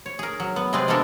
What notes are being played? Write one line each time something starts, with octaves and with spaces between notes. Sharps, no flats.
C#5
G#4 A#4
F#3
B3
C3 G#3 C4 G#4 B4 D5
G#3 A#3 B3 D4 A4 A#4